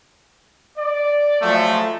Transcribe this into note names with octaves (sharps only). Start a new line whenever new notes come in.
D5
F3 F#3 G#3 A3